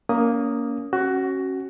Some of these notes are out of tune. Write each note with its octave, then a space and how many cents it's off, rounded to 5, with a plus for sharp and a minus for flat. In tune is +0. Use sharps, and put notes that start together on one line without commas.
A#3 +0 C#4 +25 D#6 +0
C#4 -25 F#4 +15